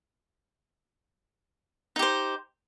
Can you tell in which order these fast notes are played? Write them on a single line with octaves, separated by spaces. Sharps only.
D#4 G4 C5